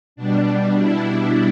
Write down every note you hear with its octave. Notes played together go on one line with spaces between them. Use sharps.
B2 G3 D4
E4
D4